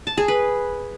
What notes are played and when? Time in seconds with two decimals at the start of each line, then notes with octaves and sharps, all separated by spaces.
0.07 A5
0.18 G#4
0.28 B4